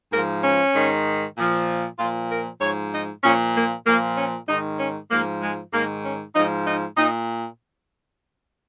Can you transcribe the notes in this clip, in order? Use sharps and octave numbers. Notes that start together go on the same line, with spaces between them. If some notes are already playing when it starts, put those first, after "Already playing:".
G#2 F3 A#4
C#4
G#2 D#3
A#2 F3
A#2 F3 F4
A#4
G#2 F3 C#5
D#4
A#2 F3 C#4
A#3
A#2 F3 A#3
C#4
G#2 D#3 D#4
C#4
G#2 F3 A#3
G#3
G#2 D#3 A#3
C#4
G#2 F3 D#4
D#4
A#2 D#4